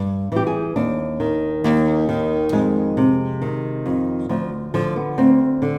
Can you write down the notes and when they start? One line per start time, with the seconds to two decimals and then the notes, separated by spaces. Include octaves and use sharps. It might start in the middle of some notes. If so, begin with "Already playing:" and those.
Already playing: G2
0.32 E3 G4
0.47 G#4
0.76 D#2 D4
1.20 D#3
1.64 D#2
2.09 D#3
2.52 F2 G#3
2.97 C3
3.42 D#3
3.86 F2
4.29 D2 F3
4.74 D3 F3
4.96 B3
5.18 D2 C4
5.62 D3